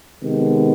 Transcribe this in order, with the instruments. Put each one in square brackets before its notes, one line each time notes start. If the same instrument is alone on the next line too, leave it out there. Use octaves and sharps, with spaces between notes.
[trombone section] C3 D#3 G#3 B3